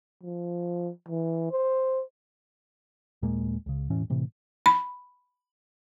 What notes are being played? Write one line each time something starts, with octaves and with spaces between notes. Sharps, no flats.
F3
E3
C5
D#2 A#2 G#3 A#3
C#2 C#3
E1 A2 E3 C#4
A2 C3 E3
B5